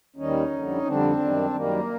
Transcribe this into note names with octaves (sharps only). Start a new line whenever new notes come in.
D#2 D#3 G3 C#4 D#4
F2 D3 G3
F2 D3 G3 C4 D4
F#2 D#3 G3
F#2 D#3 G3 A#3